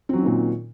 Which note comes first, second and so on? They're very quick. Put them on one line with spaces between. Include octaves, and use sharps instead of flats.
C4 F#3 C#4 D#3 A#2